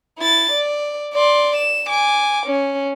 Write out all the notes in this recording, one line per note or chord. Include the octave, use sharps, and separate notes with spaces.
E4 A6
D5
D5 C6
E7
G#5 D6
C#4